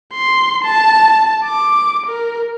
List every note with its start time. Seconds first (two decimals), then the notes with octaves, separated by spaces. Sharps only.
0.13 C6
0.64 A5
1.44 D6
2.06 A#4